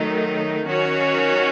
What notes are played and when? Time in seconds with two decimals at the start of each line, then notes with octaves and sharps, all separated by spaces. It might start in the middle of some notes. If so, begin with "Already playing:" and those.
Already playing: D#3 F#3 A3 D#4
0.65 D#3 F#3 C#4 F#4 C#5